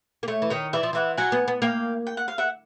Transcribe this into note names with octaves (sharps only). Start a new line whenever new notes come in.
A#3
A3 C#5
E3
D#3 C#5 D#5
E3 D5 E5
F3
E3 E5 F#5
F#3 F#5 G#5
B3
B3
A#3 F5 G5
G5
F#5
F5
E5 F#5